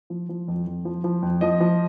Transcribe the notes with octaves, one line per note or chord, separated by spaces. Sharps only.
F3
F3
F2
F2
F3
F3
F2
F3 D#5
F3